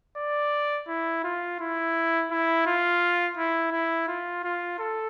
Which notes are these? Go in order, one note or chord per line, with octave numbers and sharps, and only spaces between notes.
D5
E4
F4
E4
E4
F4
E4
E4
F4
F4
A4